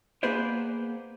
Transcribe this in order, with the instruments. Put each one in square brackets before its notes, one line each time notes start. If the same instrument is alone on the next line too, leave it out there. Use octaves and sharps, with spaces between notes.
[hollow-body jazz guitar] A#3 B3 G#4 B4 C5 D5